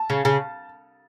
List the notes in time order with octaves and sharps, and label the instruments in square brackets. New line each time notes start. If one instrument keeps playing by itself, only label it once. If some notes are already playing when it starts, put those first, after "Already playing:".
Already playing: [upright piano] A5
[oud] C#3
C#3